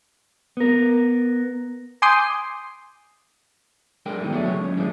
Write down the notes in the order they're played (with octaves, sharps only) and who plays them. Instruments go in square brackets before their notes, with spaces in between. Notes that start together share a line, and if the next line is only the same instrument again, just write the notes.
[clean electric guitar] B3 A#4
[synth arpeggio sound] G#5 C6 D6 D#6 G6 C7
[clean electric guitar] D3 G#3 A#4 G5
G2 B2 D#3 E3
B2 D3 F#3 G#3 A3 B3
C#2 C#5
C#2 F#2 C#4
A#2 D3 E3 G#3 A3